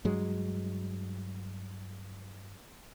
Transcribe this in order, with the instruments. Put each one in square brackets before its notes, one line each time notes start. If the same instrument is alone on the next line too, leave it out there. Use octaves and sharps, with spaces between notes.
[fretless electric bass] G2 F#3 G#3